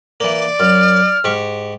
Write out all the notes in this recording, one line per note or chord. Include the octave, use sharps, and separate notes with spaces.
E3 A#3 D5
F#2 F6
G#2 G4 C#6